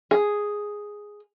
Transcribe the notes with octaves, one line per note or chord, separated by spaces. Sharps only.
G#4